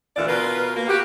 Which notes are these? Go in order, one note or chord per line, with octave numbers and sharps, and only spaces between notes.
D2 A#2 E3 F4 D5
B2 F4 A#4 B4
A#3
F#4 G4